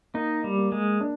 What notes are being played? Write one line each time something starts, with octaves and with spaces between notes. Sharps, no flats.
A#3 D#4
G3
A#3
G#3
D4